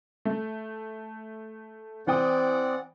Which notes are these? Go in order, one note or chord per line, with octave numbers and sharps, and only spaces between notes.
A3
E3 C4 D5 F#5 G5 D#6